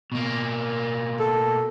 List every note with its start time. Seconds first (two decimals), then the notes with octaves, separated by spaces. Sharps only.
0.12 B2 A#3
1.20 A4